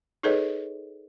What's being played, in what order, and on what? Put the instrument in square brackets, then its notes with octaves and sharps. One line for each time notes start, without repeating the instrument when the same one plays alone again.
[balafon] D#4 G#4 A4 B4 C#5 D#5